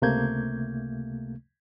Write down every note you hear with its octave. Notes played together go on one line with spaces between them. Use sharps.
C#2 C3 A3 A#3 G6 G#6